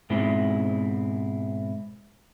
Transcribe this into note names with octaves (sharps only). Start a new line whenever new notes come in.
G#2 B2 G#3 C4 E4